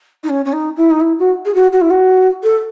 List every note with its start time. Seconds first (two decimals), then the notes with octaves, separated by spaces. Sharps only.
0.24 D#4
0.29 C#4
0.45 C#4
0.53 D#4
0.77 E4
0.91 D#4
1.01 E4
1.19 F#4
1.45 G#4
1.55 F#4
1.72 F#4
1.81 E4
1.90 F#4
2.43 A4